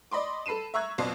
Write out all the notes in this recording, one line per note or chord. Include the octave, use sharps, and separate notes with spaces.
D5 D#5 B5 C6 D6
A4 B5 C7 D#7 E7
E5 A#5 C#6 E6 F#6 G#6
B1 F2 B2 D5 C6 C7